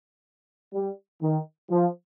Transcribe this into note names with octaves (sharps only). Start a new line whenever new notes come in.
G3
D#3
F3